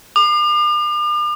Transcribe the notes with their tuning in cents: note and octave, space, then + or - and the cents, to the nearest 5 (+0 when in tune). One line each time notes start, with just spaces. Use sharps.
D6 +45